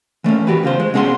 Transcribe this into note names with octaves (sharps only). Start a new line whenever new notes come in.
E3 A3 A#3 C#4
F#4 G4 B4
E2 C#3 F4 C5
G#3
B2 C#4 G#4 F#5 C6